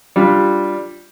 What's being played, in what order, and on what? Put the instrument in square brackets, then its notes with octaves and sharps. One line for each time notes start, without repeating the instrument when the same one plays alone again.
[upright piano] G3 D4 F4